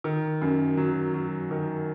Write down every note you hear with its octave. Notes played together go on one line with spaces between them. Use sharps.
D#3
F#2
F#3
F#3
D#3